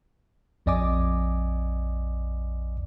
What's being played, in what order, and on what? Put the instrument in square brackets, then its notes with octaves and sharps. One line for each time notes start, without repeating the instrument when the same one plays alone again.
[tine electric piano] A#1 F2 D5 D#5 G#5 D6